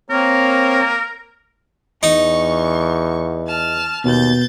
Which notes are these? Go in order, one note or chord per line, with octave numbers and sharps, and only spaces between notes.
A#3 C4 A#4 C#5
E2 D#4 C#6
A5 F6
D#2 B2 G6 A6